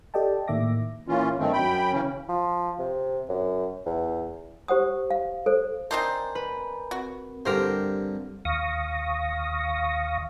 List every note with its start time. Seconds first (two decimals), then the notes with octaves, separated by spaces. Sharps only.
0.14 G4 A4 D5 D#5 G5 A5
0.48 A2 D#3 A#3 E5 D6 A#6
1.08 A#2 E3 C#4 F4
1.39 G2 D#3 A3 C4
1.53 F#2 G5 B5
1.93 C#3 E3 C#4
2.29 F3
2.79 C3
3.29 F#2
3.86 E2
4.68 G4 C5 F#5 D#6
5.10 F5
5.46 A4 C5
5.91 C4 D4 D#4 A#4 C5 G#5 A#5
6.35 B4
6.91 C4 F#4 A#4
7.46 G2 D3 C4 D4 G4 A#4 C5
8.45 D#2 F5 C#6 D#6 A#6